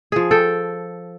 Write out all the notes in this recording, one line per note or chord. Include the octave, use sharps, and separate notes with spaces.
F3 G#4
A4 G5